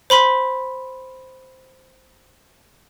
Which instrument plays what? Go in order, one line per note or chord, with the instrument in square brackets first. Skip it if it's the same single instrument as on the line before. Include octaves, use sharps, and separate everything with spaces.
[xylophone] C5 B5 C6 B6